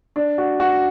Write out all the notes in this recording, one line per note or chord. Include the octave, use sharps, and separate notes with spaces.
D4
F#4
F#4